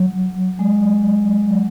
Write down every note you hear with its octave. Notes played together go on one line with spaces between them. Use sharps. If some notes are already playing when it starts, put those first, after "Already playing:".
Already playing: F#3
G#3
F#3